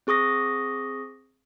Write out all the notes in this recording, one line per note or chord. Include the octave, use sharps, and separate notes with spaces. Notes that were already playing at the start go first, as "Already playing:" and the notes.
C4 G#4 C#6 D#6 A#6